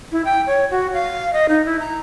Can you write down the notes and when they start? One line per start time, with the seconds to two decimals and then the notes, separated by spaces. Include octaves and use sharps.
0.12 E4
0.25 G5
0.47 C#5
0.71 F#4
0.93 F5
1.33 D#5
1.49 D#4
1.65 E4
1.79 A#5